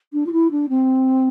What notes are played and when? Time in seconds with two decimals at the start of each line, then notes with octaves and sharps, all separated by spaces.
0.13 D4
0.26 F4
0.32 E4
0.50 D4
0.69 C4